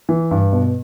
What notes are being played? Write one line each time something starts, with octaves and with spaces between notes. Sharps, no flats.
E3
G2
B2